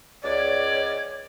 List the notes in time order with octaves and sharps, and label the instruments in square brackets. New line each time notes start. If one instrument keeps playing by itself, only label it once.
[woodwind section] C#2 D5 [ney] C#5